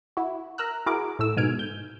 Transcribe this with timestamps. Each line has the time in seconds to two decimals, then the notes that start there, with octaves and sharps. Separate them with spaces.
0.17 E4 F#4
0.58 A#4 A#5 E6 F#6
0.86 E4 F#4 G#4 A#4 D6
1.19 A2 A3 E6
1.37 G#2 B2 G#5 F6 D7
1.59 G6